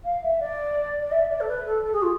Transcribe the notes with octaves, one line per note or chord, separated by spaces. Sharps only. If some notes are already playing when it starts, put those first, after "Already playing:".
F5
E5
D5
D5
E5
D5
A4
B4
A4
A4
G#4
F4